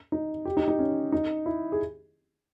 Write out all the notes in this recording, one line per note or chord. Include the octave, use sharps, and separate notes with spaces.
D#4
G4
D#4
D#4
C#4
D#4
E4
G#4